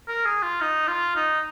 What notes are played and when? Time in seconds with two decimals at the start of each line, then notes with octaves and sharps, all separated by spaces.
0.08 A#4
0.25 G#4
0.43 F4
0.61 D#4
0.88 F4
1.16 D#4